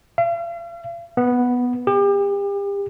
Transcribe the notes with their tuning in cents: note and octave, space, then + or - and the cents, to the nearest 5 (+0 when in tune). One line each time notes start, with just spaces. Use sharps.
F5 -45
B3 -5
G4 +35